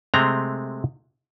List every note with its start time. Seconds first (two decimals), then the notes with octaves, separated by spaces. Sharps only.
0.14 C3 G#3 A3 C4 A#5